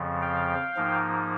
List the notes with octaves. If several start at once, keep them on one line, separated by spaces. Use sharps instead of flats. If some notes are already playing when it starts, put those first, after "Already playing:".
Already playing: F2 C#3 F3
F5 G5
G#2 F3 A#3 D#4